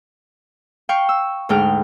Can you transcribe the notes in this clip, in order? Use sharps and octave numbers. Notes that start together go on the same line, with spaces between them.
F5 G5 C#6
E6
D2 G#2 G5 F6